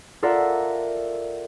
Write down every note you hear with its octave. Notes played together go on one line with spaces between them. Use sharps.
F4 A4 A#4 D5 E5 F#5